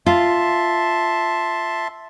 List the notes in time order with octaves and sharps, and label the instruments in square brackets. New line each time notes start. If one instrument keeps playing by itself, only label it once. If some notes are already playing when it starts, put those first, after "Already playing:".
[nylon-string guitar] F4 [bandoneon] E5 A5 C6